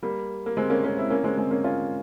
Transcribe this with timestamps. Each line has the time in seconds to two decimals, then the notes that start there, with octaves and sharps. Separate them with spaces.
0.02 G3 A#3
0.46 A#3
0.57 G#3 C4
0.70 A#3 C#4
0.84 A#3 C#4
0.97 C4 E4
1.10 A#3 C#4
1.24 G#3 C4
1.37 G#3 C4
1.51 A#3 C#4
1.64 C#4 F4